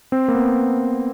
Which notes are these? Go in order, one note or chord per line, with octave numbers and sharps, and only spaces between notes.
C4
A#3
B3